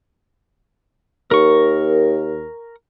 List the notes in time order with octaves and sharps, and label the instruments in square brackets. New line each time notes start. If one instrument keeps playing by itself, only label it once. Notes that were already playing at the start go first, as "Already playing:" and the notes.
[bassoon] D#2 [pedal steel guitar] A#4 C#6